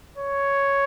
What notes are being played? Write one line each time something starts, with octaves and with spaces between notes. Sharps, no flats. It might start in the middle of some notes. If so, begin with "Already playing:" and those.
C#5